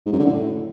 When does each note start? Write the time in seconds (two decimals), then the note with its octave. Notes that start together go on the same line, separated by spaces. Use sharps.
0.06 G#2
0.12 F#2
0.19 D3
0.26 A2